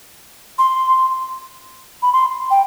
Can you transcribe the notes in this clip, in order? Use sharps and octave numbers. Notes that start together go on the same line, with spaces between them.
C6
B5
C6
G5